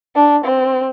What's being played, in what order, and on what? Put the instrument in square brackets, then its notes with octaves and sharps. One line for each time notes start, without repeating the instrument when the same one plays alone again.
[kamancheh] D4
C4